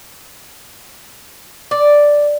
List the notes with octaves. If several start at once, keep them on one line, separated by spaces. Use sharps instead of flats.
D5